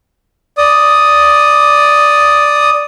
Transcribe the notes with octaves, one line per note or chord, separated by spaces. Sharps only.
D5 D#6